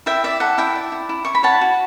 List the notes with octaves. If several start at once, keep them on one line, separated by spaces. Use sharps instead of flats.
E4 E5 G5
D5 E5
A4 F#5
E4 E5 G5
D5
E4
E4
E4 C#6
B5
C#5 F#5 A5
F#4